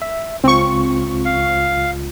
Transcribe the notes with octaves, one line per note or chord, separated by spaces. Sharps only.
E5
C#2 C4 F4 C#6
F5